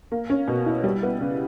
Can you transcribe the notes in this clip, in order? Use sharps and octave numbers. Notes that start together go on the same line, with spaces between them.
A#3
C#4
B2
E4
G3
B3
C#3